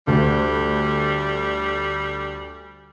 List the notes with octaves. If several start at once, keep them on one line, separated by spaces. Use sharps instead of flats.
D2 G3